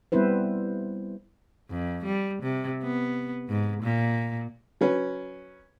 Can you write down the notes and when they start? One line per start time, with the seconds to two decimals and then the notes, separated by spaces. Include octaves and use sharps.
0.12 G3 B3 C4 E4 B4 C5
1.70 F2
2.05 G3
2.43 C3
2.83 B3
3.49 G#2
3.83 A#2
4.81 F#3 C#4 B4